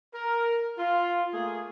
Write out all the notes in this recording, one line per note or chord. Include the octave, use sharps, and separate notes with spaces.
A#4
F4
A3 A#3 G#4